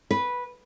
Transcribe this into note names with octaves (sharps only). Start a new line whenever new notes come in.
B4